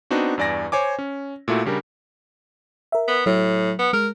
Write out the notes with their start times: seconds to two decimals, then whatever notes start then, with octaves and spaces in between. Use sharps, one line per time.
0.11 B3 C4 D4 D#4 F#4
0.38 E2 G2 D5 G#5 A#6
0.72 C5 C#5 G#5 D6
0.99 C#4
1.48 A#2 A3 E4 F#4
1.66 C#3 G3 D4 A#4
2.92 A#4 E5
3.08 B3
3.26 A2 F#3
3.79 B3
3.93 G#3 A#4